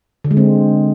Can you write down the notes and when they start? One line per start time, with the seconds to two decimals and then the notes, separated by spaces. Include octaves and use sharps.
0.24 D3
0.31 G#3
0.37 C4